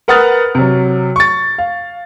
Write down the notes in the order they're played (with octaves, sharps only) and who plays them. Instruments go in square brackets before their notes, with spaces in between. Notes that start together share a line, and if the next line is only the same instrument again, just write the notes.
[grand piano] A#4 B4 F#5 D#6 F6 A6
C3 F#3
C#6 A6
F5